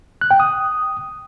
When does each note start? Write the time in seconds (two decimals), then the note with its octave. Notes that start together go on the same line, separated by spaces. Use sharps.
0.21 F#6
0.31 G5
0.40 D#6